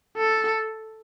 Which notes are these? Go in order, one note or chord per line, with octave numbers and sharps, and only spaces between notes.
A4